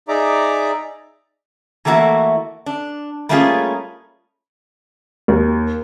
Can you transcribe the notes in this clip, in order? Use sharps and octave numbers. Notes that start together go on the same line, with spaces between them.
D#4 G#4 D5 E5 A#5 D6
E3 A3 A#3 E4 F#4
D4
G3 A3 A#3 C#4 F4 G#4
D#2